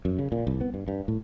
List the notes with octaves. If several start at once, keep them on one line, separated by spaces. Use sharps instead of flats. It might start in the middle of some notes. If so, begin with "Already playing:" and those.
F#2
C#3
A#2
C2
B3
G2
G2
A2